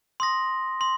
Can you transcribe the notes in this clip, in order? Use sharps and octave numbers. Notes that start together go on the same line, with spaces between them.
C6 D#6 A#6
C6